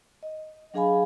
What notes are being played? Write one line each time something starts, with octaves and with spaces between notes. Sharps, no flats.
D#5
F#3 D4 G#4 F5 G#5 B5